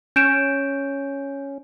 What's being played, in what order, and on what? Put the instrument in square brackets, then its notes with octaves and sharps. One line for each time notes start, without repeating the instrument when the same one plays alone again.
[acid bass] C#4 [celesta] G6 D7 E7